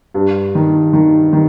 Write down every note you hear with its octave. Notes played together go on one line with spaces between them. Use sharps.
G2
D#3
D#3
D#3